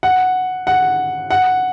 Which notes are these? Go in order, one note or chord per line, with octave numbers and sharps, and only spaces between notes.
F#5
F#5
F#5